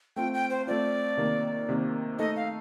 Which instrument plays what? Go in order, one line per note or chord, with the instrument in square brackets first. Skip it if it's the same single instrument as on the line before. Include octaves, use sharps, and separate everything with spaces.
[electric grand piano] A3 C4 F4 [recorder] G5
[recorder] G5
C5
[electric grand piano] A3 C4 F4 [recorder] D5
[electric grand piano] C3 D#3 A#3
C3 D#3 A#3
[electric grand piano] A3 D#4 A4 [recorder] D#5
[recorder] F5